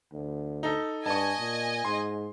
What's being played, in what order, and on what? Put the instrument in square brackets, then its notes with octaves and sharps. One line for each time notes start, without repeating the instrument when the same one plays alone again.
[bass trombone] D2
[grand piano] D#4 A4
[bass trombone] G2 [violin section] D#5 G#5 [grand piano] A5 C#6
[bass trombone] A#2
[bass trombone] G#2 [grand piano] C6